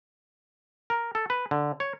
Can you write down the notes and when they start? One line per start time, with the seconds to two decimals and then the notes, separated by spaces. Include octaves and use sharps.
0.90 A#4
1.15 A4
1.30 B4
1.51 D3
1.80 C#5